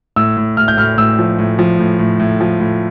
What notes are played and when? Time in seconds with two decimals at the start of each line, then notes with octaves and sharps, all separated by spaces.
0.16 A2 E6
0.37 A2
0.57 A2 F6
0.68 G6
0.78 A2 F6
0.98 A2 E6
1.19 F3
1.39 A2
1.59 F3
1.79 A2
1.99 A2
2.20 A2
2.40 F3
2.60 A2